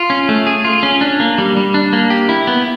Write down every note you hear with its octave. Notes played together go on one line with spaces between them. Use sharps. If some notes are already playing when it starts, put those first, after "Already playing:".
Already playing: F4
C#4
A3
G#4
F4
C#4
D4
A#3
G3
G3
D4
A#3
G4
E4
B3